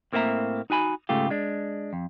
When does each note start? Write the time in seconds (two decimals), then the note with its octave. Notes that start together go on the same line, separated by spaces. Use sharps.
0.13 A2 A#3 C4 E4 E5 A#5
0.70 D#4 F#4 G#5 B5
1.09 G#2 C#3 A3 F4 G4
1.30 G#3 D4
1.93 F2